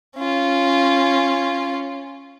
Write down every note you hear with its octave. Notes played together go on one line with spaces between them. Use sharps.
C#4 F4